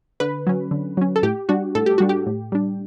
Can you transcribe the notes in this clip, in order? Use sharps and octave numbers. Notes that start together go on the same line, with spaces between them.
D3 B4
F#3 C#4
D3
F#3 C#4
A4
A2 G4
G3 D4 F#4
A2 A4
G4
G3 D4 F#4
G4
A2
G3 D4